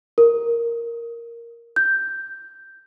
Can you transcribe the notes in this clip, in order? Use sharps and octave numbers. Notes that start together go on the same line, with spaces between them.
A#4
G6